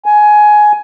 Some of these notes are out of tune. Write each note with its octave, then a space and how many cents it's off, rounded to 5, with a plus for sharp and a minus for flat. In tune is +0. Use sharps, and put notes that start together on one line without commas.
G#5 +15